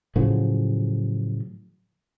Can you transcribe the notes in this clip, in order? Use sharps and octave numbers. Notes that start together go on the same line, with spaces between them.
A2 C#3 F3 F#3